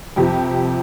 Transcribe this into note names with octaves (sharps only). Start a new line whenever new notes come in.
F2 C3 F3 G4